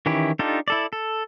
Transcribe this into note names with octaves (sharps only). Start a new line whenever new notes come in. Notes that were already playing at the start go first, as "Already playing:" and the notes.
D#3 E3 C#4 E4 G4
D4 D#4 F4 G4 A4
E4 A4 D5
A4